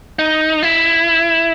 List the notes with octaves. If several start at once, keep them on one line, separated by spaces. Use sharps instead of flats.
D#4
E4